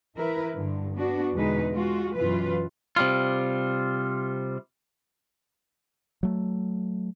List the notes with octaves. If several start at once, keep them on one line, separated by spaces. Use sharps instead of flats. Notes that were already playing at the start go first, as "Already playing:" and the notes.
E3 E4 A#4 B4
G2 D3
B3 D4 F#4
E2 B2 D3 G#3 D#4 B4
G#3 F4 F#4
F#2 B2 E3 F4 B4
C3 G3 F4
F#3 A3